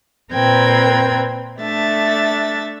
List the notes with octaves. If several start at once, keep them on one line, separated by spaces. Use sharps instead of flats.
A#2 C4 A#4 B4 G5 G#6
A3 D4 E5 A6